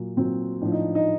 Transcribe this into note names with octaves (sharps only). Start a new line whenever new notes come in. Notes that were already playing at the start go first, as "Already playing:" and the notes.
Already playing: A#2 F#3
A#2 F#3 C4
A2 F3 D4
D#4
D#4